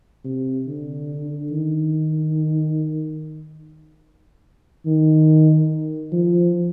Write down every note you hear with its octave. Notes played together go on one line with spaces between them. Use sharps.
C3
D3
D#3
D#3
F3